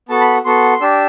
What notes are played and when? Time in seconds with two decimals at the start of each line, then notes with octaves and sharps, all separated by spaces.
0.09 B3 F#4 A4 A5
0.21 B5
0.45 B3 F#4 A4 C6
0.81 D4 G4 E6